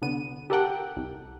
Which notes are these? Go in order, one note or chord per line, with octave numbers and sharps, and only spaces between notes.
C2 D3 B3 D#7
G4 A4 A#4 F#5 G5
C2